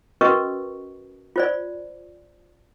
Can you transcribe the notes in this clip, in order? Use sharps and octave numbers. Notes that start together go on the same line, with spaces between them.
C#4 F#4 A#4 B4 D#5 C#6
F4 C5 D5